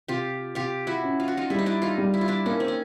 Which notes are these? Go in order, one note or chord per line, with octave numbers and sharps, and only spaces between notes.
C3 F4 G4
C3 F4 G4
E4 F#4
C#4
F4
F#4
D#4 F4
G3 E4
D#4
D4 E4
D#4 F4
G3
E4
F4
D4 E4
A#3 C#4 D#4
C4
C#4